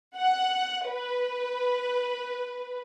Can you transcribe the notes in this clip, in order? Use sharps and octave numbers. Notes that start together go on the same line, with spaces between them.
F#5
B4